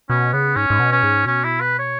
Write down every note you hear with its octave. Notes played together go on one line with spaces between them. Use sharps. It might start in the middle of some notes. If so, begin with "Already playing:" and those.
B2 C#4
C#3 B3
G#2 C#4
G#2
B2
C#4
G#2
B2 C#4
E4
B4
C#5